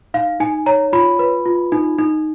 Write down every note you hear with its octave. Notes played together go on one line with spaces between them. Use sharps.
D#4 F5
D#4 G#5
C#5 A#5
F4 B5
B4
F4
D#4
D#4